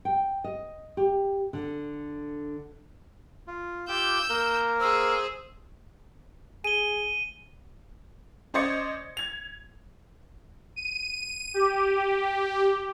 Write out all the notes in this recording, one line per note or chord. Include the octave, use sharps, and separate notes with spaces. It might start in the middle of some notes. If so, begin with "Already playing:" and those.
G5
D#5
G4
D3
F4
F4 G4 D6 E6 G6
A#3 A#4
G#4 C5 E6
G#4 D#7 G7
C#4 C5 D5 D#5 G#6 C#7
G#6 F7
D#7
G4